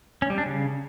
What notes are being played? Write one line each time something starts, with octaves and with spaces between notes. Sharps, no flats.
C#4
G3
D4
C#3